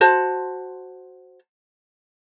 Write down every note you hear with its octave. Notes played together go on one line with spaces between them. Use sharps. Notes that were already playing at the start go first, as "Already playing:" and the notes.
F#4 C5 A5